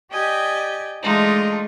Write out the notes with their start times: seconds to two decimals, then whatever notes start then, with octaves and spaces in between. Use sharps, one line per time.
0.12 G4 D5 D#5 G5 G#5
1.02 E3 G#3 A3 D4 D#4 F4